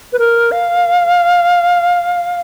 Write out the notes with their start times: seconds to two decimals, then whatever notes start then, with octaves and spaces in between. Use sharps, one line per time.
0.13 B4
0.19 A#4
0.52 F5